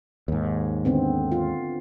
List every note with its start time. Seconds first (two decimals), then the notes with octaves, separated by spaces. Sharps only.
0.28 D#2 G#2
0.85 D3 B3 C4
1.32 F4